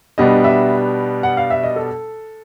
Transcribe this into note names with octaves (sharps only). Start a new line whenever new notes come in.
B2 G3 B3 D4 D#5
E5
F#5
F5
E5
D#5
A4